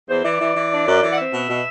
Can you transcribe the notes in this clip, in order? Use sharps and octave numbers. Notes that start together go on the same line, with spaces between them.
E2 C5
E3 D5
E3
E3
D4
F#2
E3
F#5
C4 E5
B2
B2